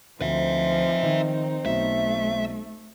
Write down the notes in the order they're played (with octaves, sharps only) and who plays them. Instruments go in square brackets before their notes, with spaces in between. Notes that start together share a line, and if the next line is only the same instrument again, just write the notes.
[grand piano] D2 [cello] F3 [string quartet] C4 D#4 [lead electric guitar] B4 E5
[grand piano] D#3
[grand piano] B1 [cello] A3 [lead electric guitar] E5